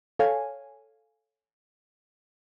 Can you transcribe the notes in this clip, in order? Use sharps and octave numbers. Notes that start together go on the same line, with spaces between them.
A4 C#5 F5 G#5